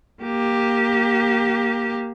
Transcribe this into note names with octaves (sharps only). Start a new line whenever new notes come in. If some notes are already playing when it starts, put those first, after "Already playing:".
A#3 G4